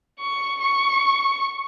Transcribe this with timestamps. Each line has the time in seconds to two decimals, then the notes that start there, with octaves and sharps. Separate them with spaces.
0.20 C#6
0.61 C#6